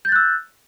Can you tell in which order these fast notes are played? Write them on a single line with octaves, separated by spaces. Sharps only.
G6 A6 F#6 E6